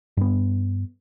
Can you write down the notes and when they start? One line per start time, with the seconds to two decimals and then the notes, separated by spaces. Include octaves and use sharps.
0.17 G2 B3